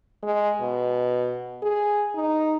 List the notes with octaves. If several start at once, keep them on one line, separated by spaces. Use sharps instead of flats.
G#3
B2
G#4
D#4